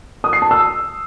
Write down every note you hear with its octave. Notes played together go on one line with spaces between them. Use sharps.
D#6
C7
A5
E6